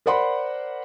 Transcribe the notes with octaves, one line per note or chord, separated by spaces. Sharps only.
A#4 C5 D5 F#5 B5 C6